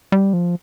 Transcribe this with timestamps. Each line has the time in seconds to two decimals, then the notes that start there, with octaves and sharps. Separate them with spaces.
0.12 G3
0.33 F3